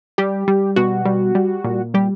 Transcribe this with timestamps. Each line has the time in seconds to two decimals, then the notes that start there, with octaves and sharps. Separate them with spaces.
0.18 G3 G4
0.48 G3
0.76 B2 F#4
1.05 G3
1.35 G3
1.64 A#2
1.94 G3 G4